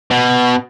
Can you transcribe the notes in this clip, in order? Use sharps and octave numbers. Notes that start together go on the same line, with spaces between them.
B2